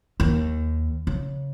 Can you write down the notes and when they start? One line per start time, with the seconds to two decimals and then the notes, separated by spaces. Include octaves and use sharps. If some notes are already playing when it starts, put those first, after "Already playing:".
0.20 D#2
1.07 C#3